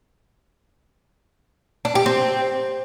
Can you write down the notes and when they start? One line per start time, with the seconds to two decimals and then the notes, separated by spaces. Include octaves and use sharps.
1.85 D4
1.95 G4
2.06 C4